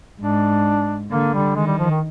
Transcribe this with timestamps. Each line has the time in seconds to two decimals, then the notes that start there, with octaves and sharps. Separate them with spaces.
0.21 G#2 D4
1.11 D3 A#3
1.34 G3
1.56 D#3 G#3
1.67 G3
1.78 F3
1.90 D#3